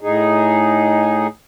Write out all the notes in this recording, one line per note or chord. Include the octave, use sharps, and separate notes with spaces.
A2 D#4 G#4